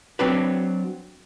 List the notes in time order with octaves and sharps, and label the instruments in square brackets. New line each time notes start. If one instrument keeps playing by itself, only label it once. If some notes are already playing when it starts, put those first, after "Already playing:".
[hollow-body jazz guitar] F#3 C4 D4 B4